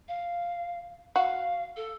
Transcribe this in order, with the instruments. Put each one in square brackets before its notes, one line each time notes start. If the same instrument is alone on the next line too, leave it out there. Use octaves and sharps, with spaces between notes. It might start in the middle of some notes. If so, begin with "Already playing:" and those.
[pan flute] F5
[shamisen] F#4 [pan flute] F5
[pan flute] A4